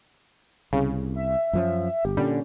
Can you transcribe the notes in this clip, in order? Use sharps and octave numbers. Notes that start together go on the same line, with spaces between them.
C2 C#3
E5
F#2 F3 C#4
G1 G4
A#2 D3 G3 C#4